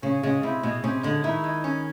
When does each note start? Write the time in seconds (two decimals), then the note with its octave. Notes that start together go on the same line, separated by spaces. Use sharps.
0.02 C#3 C#4
0.23 C#3 G#3
0.43 C3 E4
0.63 B2 G#3
0.84 C3 C#4
1.03 D3 G#3
1.24 D#3 E4
1.44 G#3
1.64 C#4